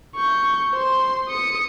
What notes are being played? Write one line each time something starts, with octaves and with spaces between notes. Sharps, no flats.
C#6 G6
C5 C6
D#6 C#7